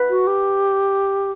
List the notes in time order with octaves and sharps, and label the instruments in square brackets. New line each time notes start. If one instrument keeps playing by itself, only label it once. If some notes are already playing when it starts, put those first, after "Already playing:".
Already playing: [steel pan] B4
[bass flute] F#4
G4